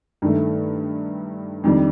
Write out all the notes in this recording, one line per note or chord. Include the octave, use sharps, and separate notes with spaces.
G2 D#3 A3
F2 D#3 G3 D4